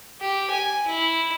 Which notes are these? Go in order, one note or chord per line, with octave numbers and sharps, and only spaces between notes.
G4
G#5
E4